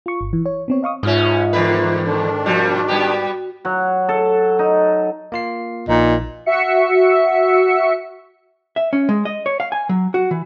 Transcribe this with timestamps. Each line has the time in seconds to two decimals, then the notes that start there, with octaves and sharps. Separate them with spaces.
0.06 F4 C#6
0.21 G1
0.33 E3
0.46 C#5
0.68 B3 C4 C#5
0.83 D#5 F5 C#6 D#6
1.03 G#2 B2 C#4 D#4 F4 E5
1.53 E2 D3 D#3 B4
2.06 D#3 D4 A4
2.46 B2 F3 G3 F#4
2.88 G3 B3 G4
3.65 F#3
4.09 A4
4.59 D#4
5.32 A#3 F4 C7
5.88 A#1 A#2 D#4
6.46 F#4 E5 C#7
8.76 E5
8.93 C#4
9.09 G#3
9.25 D#5
9.46 C#5
9.60 F5
9.72 G#5
9.89 F#3
10.14 F#4
10.31 E3